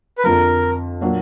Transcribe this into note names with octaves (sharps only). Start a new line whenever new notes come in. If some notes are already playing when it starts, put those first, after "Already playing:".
B4
F2 D3 F3 A#4
A#2 F#3 A#3 D4